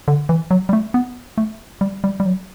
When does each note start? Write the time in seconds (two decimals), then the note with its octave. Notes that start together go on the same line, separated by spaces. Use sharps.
0.08 D3
0.29 E3
0.51 F#3
0.69 G3
0.73 A3
0.94 B3
1.38 A3
1.81 G3
2.04 G3
2.20 G3
2.26 F#3